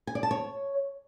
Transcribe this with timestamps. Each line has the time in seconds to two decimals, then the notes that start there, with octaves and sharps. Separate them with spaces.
0.07 G#5
0.15 D5
0.23 A5
0.31 C#5